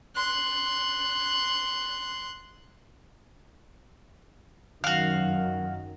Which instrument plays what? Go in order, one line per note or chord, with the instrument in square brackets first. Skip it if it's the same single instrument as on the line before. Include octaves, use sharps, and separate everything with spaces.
[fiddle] C6 F#6
[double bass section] F#2 D#3 F#3 [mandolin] F#4 F5